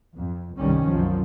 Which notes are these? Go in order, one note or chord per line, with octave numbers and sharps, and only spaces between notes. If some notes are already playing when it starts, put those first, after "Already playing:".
F2
G1 C2 C3 D#3 G3 C#4
C2 F#2 F3